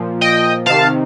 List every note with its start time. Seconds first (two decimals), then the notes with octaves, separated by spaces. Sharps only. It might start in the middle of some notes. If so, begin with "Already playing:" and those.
Already playing: A#2 F3
0.21 D#5 G5
0.66 C3 D#3 F5 A5